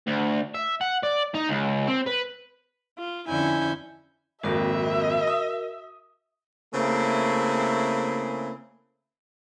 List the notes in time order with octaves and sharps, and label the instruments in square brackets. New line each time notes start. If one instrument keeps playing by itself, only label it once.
[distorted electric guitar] D2
E5
F#5
D5
D#4
C#2
C4
B4
[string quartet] F4
F2 D3 C#4 E4 G#5 G6
[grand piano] G#1 F2 A#2 [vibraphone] F#4 A#4 [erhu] E5
[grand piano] D#6
[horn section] C#3 A3 A#3 C4 E4 G#4